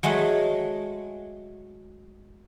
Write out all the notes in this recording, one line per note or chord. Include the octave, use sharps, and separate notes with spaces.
F#3 G#3 A3 D#5 F#5